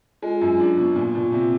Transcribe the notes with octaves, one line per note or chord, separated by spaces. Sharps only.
G#3 F4
F#2
D4
B2
A#2 F4
A#2
C3